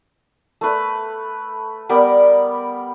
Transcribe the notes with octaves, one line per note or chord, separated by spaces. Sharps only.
A3 B4
G3 B3 A#4 D5